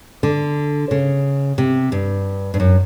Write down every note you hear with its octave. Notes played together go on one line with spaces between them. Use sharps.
D3
C#3
C3
G2
G2
F#2